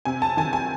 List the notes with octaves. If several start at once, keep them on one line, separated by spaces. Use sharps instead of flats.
C3 G#5
A5
D#3 G#5
G#5